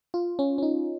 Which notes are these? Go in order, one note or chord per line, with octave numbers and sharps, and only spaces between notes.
F4
C#4
C#4
D#4